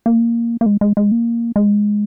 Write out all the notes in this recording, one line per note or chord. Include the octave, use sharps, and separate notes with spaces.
A#3
A#3
G#3
G#3
G#3
A#3
G#3